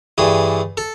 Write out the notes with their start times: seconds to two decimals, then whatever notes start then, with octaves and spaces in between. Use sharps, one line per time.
0.18 G2 E3 A3 G#4
0.77 A4